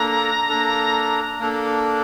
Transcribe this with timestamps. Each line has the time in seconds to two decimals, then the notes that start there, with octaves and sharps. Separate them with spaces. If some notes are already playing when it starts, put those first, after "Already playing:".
Already playing: A#3 D4 A4 A#5
0.49 A#3 D4 A4
1.40 A#3 D4 A4